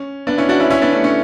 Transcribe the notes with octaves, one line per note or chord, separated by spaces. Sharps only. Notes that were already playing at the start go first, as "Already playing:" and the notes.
Already playing: C#4
B3 D4
C#4 E4
D4 F#4
C#4 E4
C#4 E4
B3 D4
A3 C#4
A3 C#4